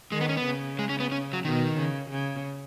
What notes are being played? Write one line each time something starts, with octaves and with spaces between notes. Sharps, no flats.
D#3 G#3
B3
C#4
B3
C#3
G#3
C#4
B3
C#4
F#3
B2 D#3
C#3
C#3